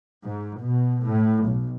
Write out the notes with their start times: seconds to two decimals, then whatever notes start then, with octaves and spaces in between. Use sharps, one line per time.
0.25 G#2
0.62 B2
1.04 A2
1.45 B1